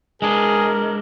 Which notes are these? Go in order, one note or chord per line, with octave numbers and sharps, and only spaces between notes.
G#3 D4 G#4 A#4